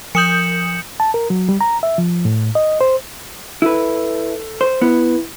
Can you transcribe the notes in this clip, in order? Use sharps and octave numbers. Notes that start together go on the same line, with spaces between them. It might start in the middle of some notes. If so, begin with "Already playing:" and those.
F3 D#6 G6 C#7 E7 F#7
A5
A#4
F#3
G3
A#5
E5
F3
A2
D#5
C5
E4 A4 B4
C5
B3 E4